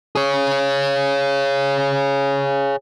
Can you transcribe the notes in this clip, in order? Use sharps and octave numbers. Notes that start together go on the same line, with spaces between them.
G#4 C#5